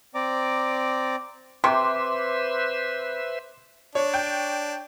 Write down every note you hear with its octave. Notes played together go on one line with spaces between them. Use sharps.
C4 D5 A#5 D6
C3 B4 C5 E5 C6 D6
D4 C#5
G5